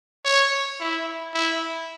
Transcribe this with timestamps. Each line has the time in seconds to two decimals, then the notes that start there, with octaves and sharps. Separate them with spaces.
0.25 C#5
0.80 E4
1.34 E4